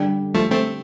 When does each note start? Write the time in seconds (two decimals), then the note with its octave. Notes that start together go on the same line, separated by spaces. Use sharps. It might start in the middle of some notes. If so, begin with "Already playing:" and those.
Already playing: D3 G3 D4 G4
0.34 F3 A3
0.51 A3 C4